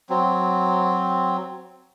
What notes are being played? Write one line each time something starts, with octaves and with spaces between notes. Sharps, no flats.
F#3 C4